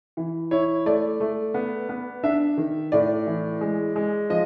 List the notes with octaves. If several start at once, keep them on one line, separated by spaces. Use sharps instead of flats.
E3
E4 C#5
A3 D5
A3
B3
B3
D4 E5
D#3
A2 D5
E3
G#3
G#3
F3 D#5